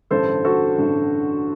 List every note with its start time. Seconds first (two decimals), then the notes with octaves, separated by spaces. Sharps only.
0.11 A1 G2 D3 A4 C5
0.45 F#4 A4
0.78 A1 G2 D3